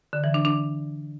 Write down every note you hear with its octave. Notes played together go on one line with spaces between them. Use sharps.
D3
E3
D4
D4